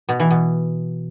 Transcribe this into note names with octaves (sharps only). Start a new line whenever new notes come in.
B2
E3
B2